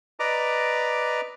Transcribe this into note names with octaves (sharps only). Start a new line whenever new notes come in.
B4 D5 D#5 A#5 D6